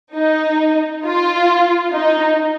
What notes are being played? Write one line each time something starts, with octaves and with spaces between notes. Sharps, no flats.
D#4
F4
D#4